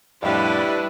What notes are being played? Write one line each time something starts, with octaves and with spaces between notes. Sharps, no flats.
F2 A2 G3 D4 E4 B4